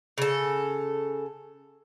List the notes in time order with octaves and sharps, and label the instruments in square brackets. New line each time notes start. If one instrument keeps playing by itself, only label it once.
[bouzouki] C#3 A4